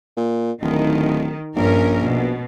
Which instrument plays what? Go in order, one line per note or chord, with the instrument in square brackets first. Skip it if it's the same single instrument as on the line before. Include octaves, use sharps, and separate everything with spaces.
[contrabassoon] A#2
[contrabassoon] D1 [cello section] D#3
[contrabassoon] A#1 [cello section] G2 C#4 A#4
[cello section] B2